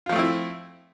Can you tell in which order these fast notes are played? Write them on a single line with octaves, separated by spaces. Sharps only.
F4 F3 A3 C4 E4